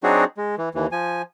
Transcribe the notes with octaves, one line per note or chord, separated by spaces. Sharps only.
F#3 C4 D4 D#4 F#4 G#4
G#3
E3
D#2 E3
F3 G#5